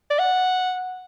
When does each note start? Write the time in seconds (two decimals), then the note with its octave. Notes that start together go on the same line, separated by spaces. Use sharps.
0.10 D5
0.19 F#5